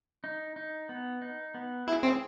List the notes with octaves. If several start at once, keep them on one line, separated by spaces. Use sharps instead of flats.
D#4
D#4
B3
D#4
B3
E4 G#4
C4